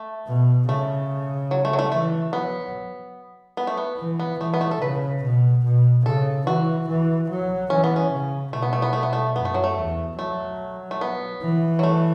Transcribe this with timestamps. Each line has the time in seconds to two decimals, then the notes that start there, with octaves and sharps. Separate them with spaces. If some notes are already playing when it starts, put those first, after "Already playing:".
Already playing: A3
0.27 B2
0.68 C#3 A3
1.51 F#3
1.65 A3
1.73 F#3
1.79 A3
1.92 E3 A3
2.33 F#3 B3
3.57 B3
3.67 A3
3.77 B3
3.98 E3
4.19 B3
4.40 E3 A3
4.54 B3
4.61 A3
4.71 A4
4.81 C#3 B4
5.23 B2
5.64 B2
6.05 C#3 A4
6.46 E3 F#4
6.88 E3
7.30 F#3
7.70 E3 C#4
7.84 B3
7.96 C#4
8.12 C#3
8.53 B2 A3
8.62 B3
8.73 A3
8.82 B3
8.93 A3
9.03 B3
9.13 A3
9.36 F#2 B3
9.45 A3
9.54 F#3
9.64 A3
9.77 E2
10.19 F#3 A3
10.91 A3
11.01 B3
11.43 E3
11.79 F#3
11.83 A3